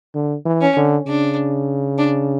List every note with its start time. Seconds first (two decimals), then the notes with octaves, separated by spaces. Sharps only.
0.15 D3
0.45 E3
0.61 C#4
0.77 D3
1.07 C#3 D4
1.98 D4